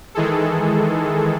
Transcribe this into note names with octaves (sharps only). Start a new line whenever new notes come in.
D#3 E3 G#3 G#4 A4